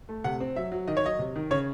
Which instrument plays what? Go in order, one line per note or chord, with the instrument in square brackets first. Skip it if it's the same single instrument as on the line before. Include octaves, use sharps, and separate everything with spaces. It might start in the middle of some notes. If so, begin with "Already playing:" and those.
[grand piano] A3
C3 F#5
C4
F#3 E5
F#3
D#3 D#5
C#5
F#3 D#5
C3
D#3
C#3 C#5